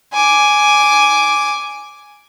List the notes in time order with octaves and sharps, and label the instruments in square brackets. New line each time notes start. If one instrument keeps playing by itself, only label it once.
[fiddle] G#5 D6